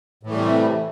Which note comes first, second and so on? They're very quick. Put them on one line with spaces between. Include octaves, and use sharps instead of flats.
A2 E3 A3 G3 C3